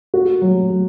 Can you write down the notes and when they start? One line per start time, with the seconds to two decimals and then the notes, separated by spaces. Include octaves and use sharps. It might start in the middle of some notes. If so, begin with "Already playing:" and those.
0.14 F#4
0.42 F#3
0.70 F#3